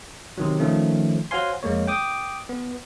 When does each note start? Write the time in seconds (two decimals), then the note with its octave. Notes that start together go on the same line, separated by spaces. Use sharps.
0.38 C3 D#3 F#3
0.59 D#3 F3 A3 C#4
1.31 F#4 C5 C#5 F5 G#5 C6
1.63 F2 G#3 A#3 C#5
1.87 G5 D6 D#6
2.49 B3